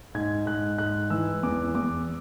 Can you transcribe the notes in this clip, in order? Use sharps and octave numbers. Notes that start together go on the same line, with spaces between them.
G#2 G#6
G#2 F#6
G#2 F#6
E3 E6
E2 D6
E2 D6